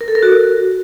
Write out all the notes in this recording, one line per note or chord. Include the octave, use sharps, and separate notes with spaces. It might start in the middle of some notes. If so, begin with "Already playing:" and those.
A#4
A4
A#4
F#4